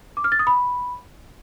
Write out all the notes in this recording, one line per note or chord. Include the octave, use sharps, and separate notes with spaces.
D6
F6
A6
D#6
B5